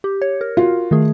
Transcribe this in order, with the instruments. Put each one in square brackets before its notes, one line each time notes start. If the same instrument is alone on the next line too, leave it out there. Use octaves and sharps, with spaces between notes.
[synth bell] G4
C#5
A#4
[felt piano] F4 F#4
[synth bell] D#3 A3 G#4